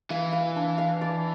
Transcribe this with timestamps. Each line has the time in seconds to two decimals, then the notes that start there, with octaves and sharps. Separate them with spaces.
0.10 E3 F5
0.32 F5
0.56 D4
0.78 F5
1.01 D5